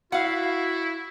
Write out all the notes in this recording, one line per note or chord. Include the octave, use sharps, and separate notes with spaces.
E4 F#4 F5 F#5